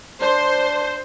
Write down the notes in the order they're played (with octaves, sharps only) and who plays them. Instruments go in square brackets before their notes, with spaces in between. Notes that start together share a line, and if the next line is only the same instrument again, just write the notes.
[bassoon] D4 [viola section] C5